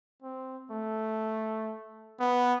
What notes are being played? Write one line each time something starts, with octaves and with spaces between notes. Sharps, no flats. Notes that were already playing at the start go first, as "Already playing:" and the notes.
C4
A3
B3